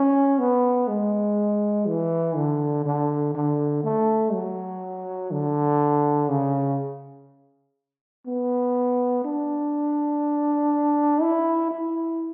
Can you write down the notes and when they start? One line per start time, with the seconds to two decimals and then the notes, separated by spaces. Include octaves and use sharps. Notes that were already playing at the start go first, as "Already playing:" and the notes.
Already playing: C#4
0.39 B3
0.88 G#3
1.86 E3
2.36 D3
2.86 D3
3.35 D3
3.84 A3
4.33 F#3
5.31 D3
6.29 C#3
8.27 B3
9.25 D4
11.22 E4
11.71 E4